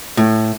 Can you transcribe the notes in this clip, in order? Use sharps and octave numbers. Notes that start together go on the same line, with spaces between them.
A2